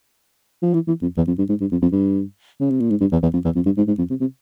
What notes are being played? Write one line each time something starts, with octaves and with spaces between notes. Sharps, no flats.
F3
E3
E3
F2
E2
F2
G2
G#2
G2
F2
F2
G2
C#3
C3
A#2
G#2
G2
E2
E2
F2
E2
F2
G2
G#2
G#2
F2
C3
C3